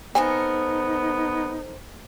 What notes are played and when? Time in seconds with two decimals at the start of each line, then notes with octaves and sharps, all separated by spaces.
0.15 B3 C4 D#4 A4 A#4 G#5